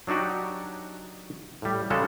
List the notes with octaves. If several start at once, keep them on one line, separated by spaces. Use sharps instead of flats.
F#3 D4 D#4 F#4 G4
A2 G3
C#3 G3 G#3 C#4 F#4 A4